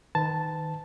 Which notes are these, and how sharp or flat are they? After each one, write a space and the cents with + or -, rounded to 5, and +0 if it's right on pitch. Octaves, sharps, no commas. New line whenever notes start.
D#3 +0 B4 +35 A5 +0